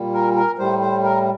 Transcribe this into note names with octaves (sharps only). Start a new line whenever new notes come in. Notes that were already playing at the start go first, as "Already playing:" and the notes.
Already playing: A#2 G3
A#4
A#4
A2 G3 C5
C5
A#4